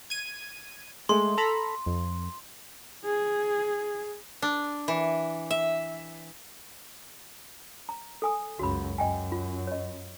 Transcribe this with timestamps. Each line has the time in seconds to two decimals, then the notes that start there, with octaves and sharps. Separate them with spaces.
0.10 G#6 D#7
1.09 G#3 A3 C6
1.38 A4 A#5 B5
1.86 F2
3.05 G#4
4.42 D4
4.88 E3
5.51 E5
7.89 A#5
8.22 A4 G#5 D#6
8.59 C#2 F#2 F#4 B5
8.98 F#2 D#5 G5 G#5
9.32 F4
9.67 C#5 D#5